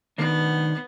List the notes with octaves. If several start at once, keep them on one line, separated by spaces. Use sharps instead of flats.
B2 D#3 B3 D4